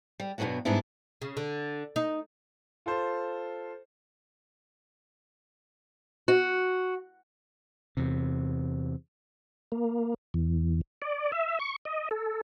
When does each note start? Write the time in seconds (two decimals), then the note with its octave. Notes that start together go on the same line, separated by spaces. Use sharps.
0.20 G3
0.38 G2 B2 E3 F#3 B3 F#4
0.65 G#2 G3 B3 D4 E4
1.22 C#3
1.37 D3
1.96 D#4
2.86 F4 A4 C5
6.28 F#4
7.97 E2 C3
9.72 A#3
10.34 E2
11.02 D5
11.32 E5
11.59 C#6
11.85 D#5
12.11 A4